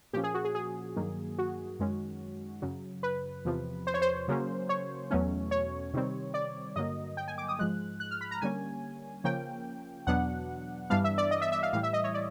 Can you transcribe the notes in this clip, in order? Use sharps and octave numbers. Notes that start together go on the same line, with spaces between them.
A#2 F3 A#3 C#4 G4
G#4
F#4
G#4
G#4
G2 D#3 F#3 A#3
F#4
F#2 D#3 G#3 C#4
F#2 C#3 F#3
B4
E2 C3 F3
C5
C#5
C5
C#3 F#3 A#3 C#4
C#5
E2 B2 F#3 A3 C#4
C#5
C3 D#3 G3 C4
D5
G2 D3 F#3 A#3 D#5
G5
G#5
D6
D#6
G#2 F3 G#3 F#6
F#6
F6
B5
A#5
D3 G3 A#3 C#4 G#5
C#3 F3 A#3 C#4 G5
E2 B2 F#3 B3 D4 F#5
G2 E3 G3 B3 D4 F5
E5
D5
D#5
E5
E5
F5
A2 E3 G3 F5
E5
D#5
C#5
D5